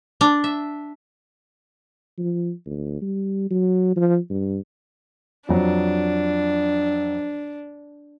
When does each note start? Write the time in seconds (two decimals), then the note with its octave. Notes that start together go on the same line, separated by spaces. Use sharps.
0.21 D4
0.44 E5
2.18 F3
2.66 D2
3.01 G3
3.51 F#3
3.96 F3
4.30 G2
5.49 F2 F#3 D4